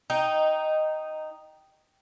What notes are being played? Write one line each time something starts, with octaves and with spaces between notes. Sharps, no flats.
D#4 G5